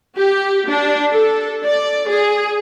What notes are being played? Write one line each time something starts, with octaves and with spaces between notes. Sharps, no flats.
G4
D4
A4
D5
G#4